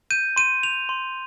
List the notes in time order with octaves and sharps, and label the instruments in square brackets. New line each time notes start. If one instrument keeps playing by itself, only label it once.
[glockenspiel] G6 D#7
C6 D#7
G6 F7
C6